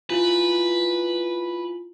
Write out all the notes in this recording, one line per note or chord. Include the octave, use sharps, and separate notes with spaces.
E4 F4 B4 G#5